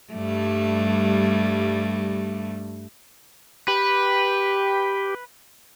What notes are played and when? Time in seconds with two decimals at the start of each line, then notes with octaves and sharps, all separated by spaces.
0.12 G2 G3 A3
3.68 G4 B4